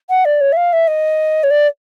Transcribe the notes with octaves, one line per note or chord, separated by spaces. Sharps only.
F#5
D5
C#5
E5
F5
E5
D#5
C#5
D5